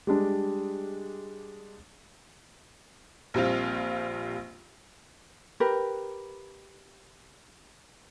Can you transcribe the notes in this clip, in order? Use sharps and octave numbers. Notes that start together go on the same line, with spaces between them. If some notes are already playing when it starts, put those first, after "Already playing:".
G3 G#3 D4
A#1 G3 C4 F4
G4 A#4 B4